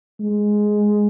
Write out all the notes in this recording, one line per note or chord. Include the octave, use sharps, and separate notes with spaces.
G#3